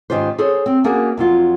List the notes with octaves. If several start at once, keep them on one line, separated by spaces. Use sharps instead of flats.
G#2 D#3 C#4 F4 G4 C5
G#4 A4 C5 C#5
C4
A#3 C#4 D4 F#4 G#4 A#4
F2 F#3 F4